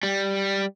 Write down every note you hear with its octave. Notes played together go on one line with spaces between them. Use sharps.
G3